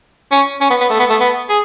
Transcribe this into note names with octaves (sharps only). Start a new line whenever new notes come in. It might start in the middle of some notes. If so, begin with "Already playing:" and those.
C#4
C#4
B3
B3
A3
B3
A3
B3
G#4